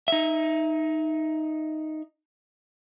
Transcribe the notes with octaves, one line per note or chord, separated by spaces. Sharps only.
D#4 E5